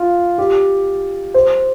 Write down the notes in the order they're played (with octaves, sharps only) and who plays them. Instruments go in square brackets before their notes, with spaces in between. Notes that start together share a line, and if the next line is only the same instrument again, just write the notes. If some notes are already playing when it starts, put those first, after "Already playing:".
Already playing: [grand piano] F4
G4
C5